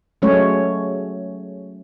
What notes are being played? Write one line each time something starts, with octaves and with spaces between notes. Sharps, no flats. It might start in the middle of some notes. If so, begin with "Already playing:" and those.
F#3 G#3 A3 C#4 C#5